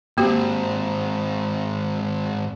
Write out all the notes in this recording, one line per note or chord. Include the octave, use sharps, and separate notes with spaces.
G#2 A#3 C4 F#4 G4